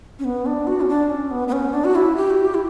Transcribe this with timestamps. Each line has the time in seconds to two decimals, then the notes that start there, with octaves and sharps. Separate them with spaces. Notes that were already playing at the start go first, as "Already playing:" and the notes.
0.19 C#4
0.25 B3
0.46 D4
0.67 F#4
0.81 C#4
0.88 D4
1.10 C#4
1.31 B3
1.48 B3
1.52 C#4
1.74 D4
1.84 F#4
1.95 E4
2.16 G4
2.30 F#4
2.37 G4
2.54 E4